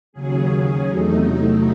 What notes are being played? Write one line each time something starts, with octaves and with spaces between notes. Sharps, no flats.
D#2 C#3 F#3 C#4 G#4
E2 C3 F#3 A3 D#4